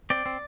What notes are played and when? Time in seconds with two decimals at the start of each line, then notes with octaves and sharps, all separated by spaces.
0.10 C4 D5
0.26 C4